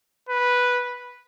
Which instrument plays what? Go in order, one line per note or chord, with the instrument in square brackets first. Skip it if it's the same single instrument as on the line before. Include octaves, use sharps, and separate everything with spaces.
[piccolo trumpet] B4